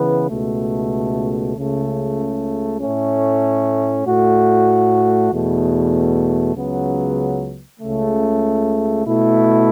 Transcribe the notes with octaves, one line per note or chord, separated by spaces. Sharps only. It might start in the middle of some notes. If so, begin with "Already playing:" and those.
Already playing: C#3 E3 B3
C#2 B2 A3
C#2 C#3 A3
A2 A3 C#4
A2 A3 F#4
E2 B2 A3
C#2 C#3 F#3 B3
C#2 C#3 A3
B2 A3 E4